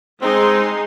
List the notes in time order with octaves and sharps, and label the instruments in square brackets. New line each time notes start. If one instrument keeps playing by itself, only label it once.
[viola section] G#3 D#4 C6 [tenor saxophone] C4